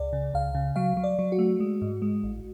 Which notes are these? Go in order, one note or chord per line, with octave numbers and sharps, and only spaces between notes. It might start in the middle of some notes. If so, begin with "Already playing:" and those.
Already playing: C#2 D5
C#3
C#2 F5
C#3
F#3 F5
F#3
D5
F#3
F#4
A3
G#3
G#2
G#3
A1